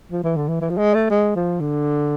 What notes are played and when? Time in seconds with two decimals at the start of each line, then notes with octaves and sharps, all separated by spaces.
0.11 F3
0.23 E3
0.36 D3
0.48 E3
0.61 E3
0.70 F3
0.78 G#3
0.94 A3
1.10 G#3
1.36 F3
1.60 D3